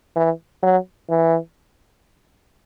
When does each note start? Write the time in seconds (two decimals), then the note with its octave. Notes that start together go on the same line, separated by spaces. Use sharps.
0.16 E3
0.63 F#3
1.10 E3